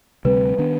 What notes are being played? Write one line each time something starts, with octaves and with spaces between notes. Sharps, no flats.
D2 C3 G3 C4 B4
D#3 B3 D4